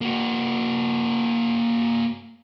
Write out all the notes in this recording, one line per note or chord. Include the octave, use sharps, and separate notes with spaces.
A#3 F#4